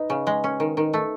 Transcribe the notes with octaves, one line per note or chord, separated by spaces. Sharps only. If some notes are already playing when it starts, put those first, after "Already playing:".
Already playing: D#4 B4 D#5
C#3
G#3
C#4
D#3
D#3
A3